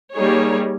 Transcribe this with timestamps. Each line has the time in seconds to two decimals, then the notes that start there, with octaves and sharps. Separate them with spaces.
0.14 G3 A#3 D#4 G#4 C#5